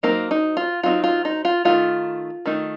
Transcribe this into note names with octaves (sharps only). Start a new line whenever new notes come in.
F#3 A#3 C4 D#4 A#4
D#4
F4
F#3 C4 D#4 F4
F4
D#4
F4
D#3 A3 D#4 F4
D#3 A3 D#4